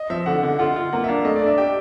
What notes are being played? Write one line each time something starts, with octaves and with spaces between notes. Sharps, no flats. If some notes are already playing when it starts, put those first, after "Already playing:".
Already playing: D#5
F3 E5
D3 F#5
D3
F4 F#5
F4
A#3 F#5
E5
D4 F5
A3 D#5
D5
D4 E5
G4 G5